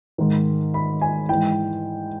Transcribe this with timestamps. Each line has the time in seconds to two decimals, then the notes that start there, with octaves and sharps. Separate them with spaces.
0.18 G#2 D#3
0.74 B5
1.01 G#5
1.29 G#2 E3 G5